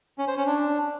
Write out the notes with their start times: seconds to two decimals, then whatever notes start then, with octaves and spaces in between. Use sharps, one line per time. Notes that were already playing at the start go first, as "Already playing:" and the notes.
0.18 C#4
0.28 C5
0.37 C#4
0.46 D4